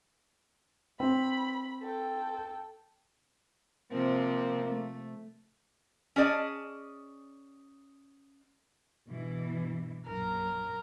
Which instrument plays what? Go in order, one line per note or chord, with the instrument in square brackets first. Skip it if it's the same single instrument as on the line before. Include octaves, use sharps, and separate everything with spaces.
[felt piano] C4 [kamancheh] B5
[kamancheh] A4 G5
[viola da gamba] C3 F3 C4 [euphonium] A#3
[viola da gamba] A3
[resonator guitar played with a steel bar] C#4 G#4 D5 D#5 A5
[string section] G2 B2 E3
[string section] A#1 F#2 [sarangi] A#4